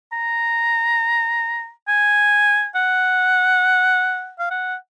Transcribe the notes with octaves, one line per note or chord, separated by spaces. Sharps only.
A#5
G#5
F#5
F5
F#5